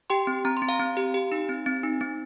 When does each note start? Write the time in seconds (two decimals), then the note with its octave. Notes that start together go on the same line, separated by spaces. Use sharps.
0.10 G4 G5 C6
0.27 C4
0.45 C4 A#5
0.57 C6
0.62 C4
0.69 F5 A#5
0.79 C4
0.97 G4
1.14 G4
1.32 D#4
1.49 C4
1.66 C4
1.83 D#4
2.01 C4